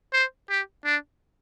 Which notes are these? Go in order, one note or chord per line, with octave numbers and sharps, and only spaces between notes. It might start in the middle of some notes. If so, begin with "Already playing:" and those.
C5
G4
D4